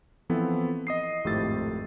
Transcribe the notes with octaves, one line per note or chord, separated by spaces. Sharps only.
E3 F3 B3 C4 E4 A4
D#5 D#6 C7
G#1 F2 A2 G4 E6 A6